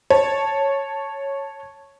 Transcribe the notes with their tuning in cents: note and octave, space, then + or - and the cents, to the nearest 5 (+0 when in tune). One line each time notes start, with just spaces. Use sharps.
C#5 -5 A5 +0